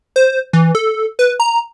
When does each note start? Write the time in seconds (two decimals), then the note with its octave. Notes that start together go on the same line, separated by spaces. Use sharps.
0.16 C5
0.53 E3
0.75 A4
1.19 B4
1.40 A#5